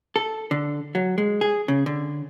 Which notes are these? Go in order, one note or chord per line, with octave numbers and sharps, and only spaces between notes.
A4
D3
F#3
G#3
G#4
C#3
D3